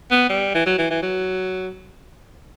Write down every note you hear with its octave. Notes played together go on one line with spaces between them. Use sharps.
B3
G3
E3
F#3
E3
E3
F#3